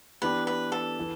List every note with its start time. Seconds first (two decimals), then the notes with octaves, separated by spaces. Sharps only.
0.22 E3 B3 D4 G4 B4
0.47 B4
0.72 A4
0.99 E3